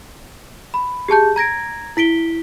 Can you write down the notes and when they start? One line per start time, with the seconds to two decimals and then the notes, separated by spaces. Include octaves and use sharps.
0.74 B5
1.08 G4 G#4 A5 G6
1.36 A#5 G#6 A#6 D7
1.97 E4 B6 D7 G7